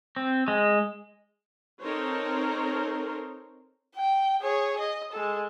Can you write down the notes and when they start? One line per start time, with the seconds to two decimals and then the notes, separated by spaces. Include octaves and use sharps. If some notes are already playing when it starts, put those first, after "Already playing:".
0.16 C4
0.48 G#3
1.80 C4 D#4 A4 A#4 C5 C#5
3.96 G5
4.41 G#4 C#5
4.79 D#5
5.13 G#3 A4